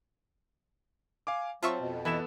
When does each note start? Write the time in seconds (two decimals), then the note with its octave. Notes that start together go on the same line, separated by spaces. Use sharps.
1.27 F5 G#5 D6
1.63 F#3 C4 F4 E5 A5 C#6
1.79 F2 B2
2.05 E3 B3 E4 A4 E7